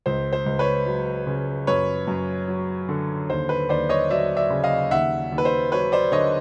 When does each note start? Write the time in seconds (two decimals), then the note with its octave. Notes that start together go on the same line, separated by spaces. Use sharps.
0.06 C#2 C5
0.33 C5
0.46 C#2
0.59 B4 C#5
0.86 F#3
1.27 C#3
1.67 F#2 B4 C#5
2.08 F#2
2.48 F#3
2.89 D3
3.30 D#2 C5
3.49 B4
3.69 D#2 C5 D5
3.89 C#5 D#5
4.10 F#3 D5 E5
4.37 D5 E5
4.50 C#3
4.64 D#5 F5
4.91 D#2 E5 F#5
5.32 D#2
5.38 B4
5.45 C5
5.72 F#3 B4 C#5
5.92 C5 D5
6.12 D3 C#5 D#5